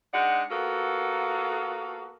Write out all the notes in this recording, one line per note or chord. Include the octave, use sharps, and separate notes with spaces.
G#3 D4 D#4 F#5
A#3 B3 F4 F#4 A4